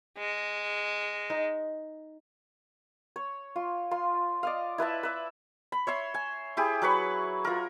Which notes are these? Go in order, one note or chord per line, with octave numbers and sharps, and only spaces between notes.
G#3
D#4
C#5
F4
F4 C6
D5 D#5 F5
E4 B4 E5 A5
B4 E5
B5
C#5 E5 C6
G#5
E4 G4 G#4
F#3 B4 B5 C#6
F4 A#4